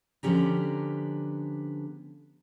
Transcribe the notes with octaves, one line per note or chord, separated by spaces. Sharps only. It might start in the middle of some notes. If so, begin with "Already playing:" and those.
D3 F3 B3 C#4 G4 A#5